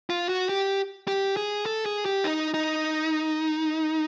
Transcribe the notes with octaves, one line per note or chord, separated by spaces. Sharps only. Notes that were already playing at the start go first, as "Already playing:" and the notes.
F4
F#4
G4
G4
G#4
A4
G#4
G4
D#4
D#4